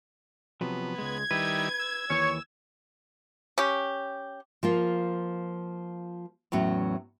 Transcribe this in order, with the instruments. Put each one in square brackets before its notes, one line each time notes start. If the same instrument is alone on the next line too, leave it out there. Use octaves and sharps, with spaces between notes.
[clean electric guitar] C3 F3 F#3 [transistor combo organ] B3
[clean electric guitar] C#2 G#3 [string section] G#6
[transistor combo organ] D#3 G3 E4 [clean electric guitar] B4
[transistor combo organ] E6
[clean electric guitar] D#2 E3 [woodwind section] C#5
[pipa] C#4 G4
[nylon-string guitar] F3 A#3 F4
E2 A2 F#3 C#4